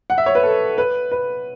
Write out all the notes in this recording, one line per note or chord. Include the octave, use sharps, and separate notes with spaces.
F#5
E5
C#5
B4
A4
B4
B4